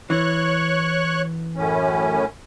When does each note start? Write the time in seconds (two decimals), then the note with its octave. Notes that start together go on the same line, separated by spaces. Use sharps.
0.10 E3 C#5 C#6 F#6
1.56 F#2 A2 C#4